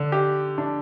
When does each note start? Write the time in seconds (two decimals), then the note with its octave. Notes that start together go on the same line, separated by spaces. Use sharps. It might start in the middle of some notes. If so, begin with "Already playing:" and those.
Already playing: D3
0.12 G4
0.58 D4